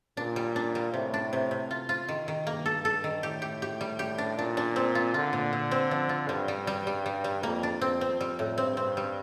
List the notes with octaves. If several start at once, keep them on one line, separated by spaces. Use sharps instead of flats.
A#2 D4
G3
D4
G3
A2 C3
D4
C3
C3
F4
F4
D#3
D#3
G2 A#3
A4
A4
D#3
A2 G4
G4
G4
G3
G4
D4
A#2 D4
D4
C4
F4
D3 F4
A#2
A#2
C4
F3
F4
G2 G3
G3
G3
G3
G3
G3
F2 A#3
D4
F2 C4
C4
G3
A2
G2 C4
C4
G3